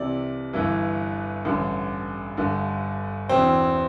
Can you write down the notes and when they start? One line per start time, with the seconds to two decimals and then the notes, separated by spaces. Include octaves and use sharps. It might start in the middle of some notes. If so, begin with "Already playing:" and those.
Already playing: C2 C3 E3 D5
0.53 G1 G2 E3
1.45 A1 G2 D3
2.37 G1 G2 D3
3.29 E1 E2 E3 C4